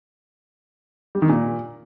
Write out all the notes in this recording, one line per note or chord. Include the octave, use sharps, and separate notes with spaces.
G3
D#3
A#2